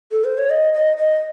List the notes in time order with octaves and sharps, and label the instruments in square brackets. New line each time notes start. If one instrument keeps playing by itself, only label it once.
[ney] A4
C5
C#5
D#5
D#5
D#5